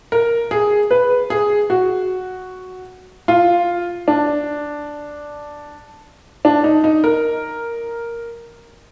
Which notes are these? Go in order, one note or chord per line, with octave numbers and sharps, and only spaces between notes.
A#4
G#4
B4
G#4
F#4
F4
D4
D4
D#4
D#4
A#4